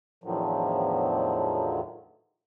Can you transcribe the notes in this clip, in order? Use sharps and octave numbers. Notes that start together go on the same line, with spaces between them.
E2 A2 D3 D#3 F3 F#3